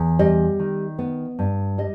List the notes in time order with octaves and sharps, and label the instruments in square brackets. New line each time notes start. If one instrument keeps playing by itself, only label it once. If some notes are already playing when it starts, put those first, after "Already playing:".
Already playing: [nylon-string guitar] E2
G3 D#5
D#3
B3
G2
G3 D#5